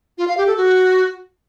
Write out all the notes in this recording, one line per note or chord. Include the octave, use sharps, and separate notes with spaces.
F4
F5
G4
A4
F#4